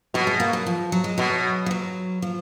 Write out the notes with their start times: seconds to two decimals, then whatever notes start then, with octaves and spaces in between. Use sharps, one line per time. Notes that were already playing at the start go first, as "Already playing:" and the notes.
0.14 B2 F#3
0.27 G#3
0.40 A#3
0.53 F#3
0.66 F3
0.92 F#3
1.04 G#3
1.18 B2 F#3
1.66 F3
1.71 F#3
2.22 F3